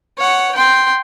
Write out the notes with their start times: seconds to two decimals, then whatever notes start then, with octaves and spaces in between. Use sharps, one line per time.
0.18 C#5 F#5
0.55 G5 C6